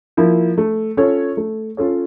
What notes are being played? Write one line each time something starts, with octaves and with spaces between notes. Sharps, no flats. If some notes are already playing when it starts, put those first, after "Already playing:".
F3 A#3 E4
A3
C#4 F4 A4 C#5
A3
C#4 F4 A4 C#5